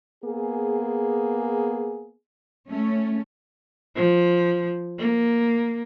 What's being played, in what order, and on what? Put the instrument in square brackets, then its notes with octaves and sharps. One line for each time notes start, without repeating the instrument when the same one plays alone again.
[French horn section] A#3 B3 G#4
[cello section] A3 C#4
[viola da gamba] F3
A#3